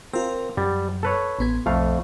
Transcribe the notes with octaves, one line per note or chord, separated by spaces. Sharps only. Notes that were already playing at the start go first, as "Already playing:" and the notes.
C4 F4 A#4
F#2 G3
A4 B4 C#5
A1 B3 G#6
B1 F2 A3 F5